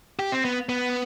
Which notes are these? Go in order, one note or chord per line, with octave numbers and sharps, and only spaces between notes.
G4
C4
B3
B3